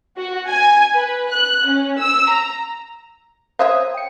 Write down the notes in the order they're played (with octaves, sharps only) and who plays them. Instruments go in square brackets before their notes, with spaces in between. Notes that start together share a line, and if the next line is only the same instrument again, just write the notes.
[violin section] F#4
G#5
B4
F#6
C#4
E6
A#5
[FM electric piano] C5 D#6 [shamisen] C#5 E5 F5
[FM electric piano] G5 C#7